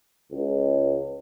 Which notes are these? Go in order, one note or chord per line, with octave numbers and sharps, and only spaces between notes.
C#2